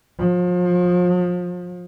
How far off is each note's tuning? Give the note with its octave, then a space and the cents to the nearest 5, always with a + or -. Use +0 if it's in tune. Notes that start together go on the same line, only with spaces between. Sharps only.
F3 +35